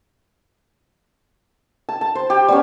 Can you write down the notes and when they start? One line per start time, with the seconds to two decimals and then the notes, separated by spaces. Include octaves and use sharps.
1.89 A5
2.01 A5
2.15 C5
2.30 G4
2.48 G3 B3 C#4